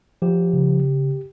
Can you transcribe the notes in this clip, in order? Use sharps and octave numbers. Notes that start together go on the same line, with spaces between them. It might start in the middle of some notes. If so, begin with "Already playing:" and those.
F3 G4
C#3